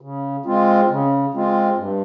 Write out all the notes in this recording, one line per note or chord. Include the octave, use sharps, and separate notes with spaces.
C#3
G#3 C4 F4
C#3
G#3 C4 F4
G2